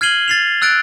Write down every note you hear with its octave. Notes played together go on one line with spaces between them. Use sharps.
F6 G#6 C7 D#7 F#7 G7
A6 C7 F7
E6 F#6 A6 D7